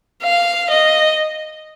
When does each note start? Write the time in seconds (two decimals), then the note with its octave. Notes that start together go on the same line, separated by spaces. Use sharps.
0.23 F5
0.71 D#5